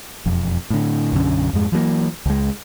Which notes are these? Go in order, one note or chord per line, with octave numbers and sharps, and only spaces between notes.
E1 F2
A2 D3
B1 F#2 D3 C#4
F2 G#2 G#3
E3 F#3 G3 A#3
C#2 G#3